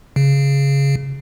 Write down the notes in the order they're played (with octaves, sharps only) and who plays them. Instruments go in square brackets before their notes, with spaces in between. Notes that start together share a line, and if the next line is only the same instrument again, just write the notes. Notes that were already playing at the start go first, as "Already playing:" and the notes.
[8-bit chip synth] C#3